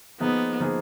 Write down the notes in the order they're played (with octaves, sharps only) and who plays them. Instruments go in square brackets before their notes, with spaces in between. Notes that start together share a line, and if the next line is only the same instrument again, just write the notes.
[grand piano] F3 A#3 D#4 G#4 [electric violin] B3
[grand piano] F3 A#3 D#4 G#4